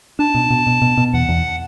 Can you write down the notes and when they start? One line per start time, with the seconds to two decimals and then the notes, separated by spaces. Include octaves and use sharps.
0.19 D4 A5
0.35 B2
0.50 B2
0.67 B2
0.82 B2
0.97 B2
1.14 E2 F#5
1.29 E2